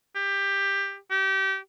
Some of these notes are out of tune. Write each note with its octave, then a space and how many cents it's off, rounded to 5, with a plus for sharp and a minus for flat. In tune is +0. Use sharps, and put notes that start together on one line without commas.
G4 +15
G4 -25